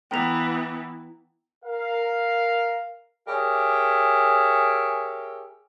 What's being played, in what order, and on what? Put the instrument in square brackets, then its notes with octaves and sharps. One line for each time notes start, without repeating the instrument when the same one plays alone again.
[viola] E3 B3 [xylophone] G5 A#5 F7
[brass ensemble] A#4 F5
[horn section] G4 G#4 A#4 C#5 E5